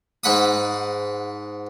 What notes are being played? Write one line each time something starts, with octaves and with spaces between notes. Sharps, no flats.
G#2 F#5 B5 D#6